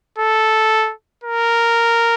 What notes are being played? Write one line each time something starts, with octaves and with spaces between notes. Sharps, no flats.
A4
A#4